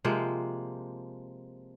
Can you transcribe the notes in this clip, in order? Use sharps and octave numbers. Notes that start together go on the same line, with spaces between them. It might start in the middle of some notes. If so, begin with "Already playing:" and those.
C3 F3 G#3 A#3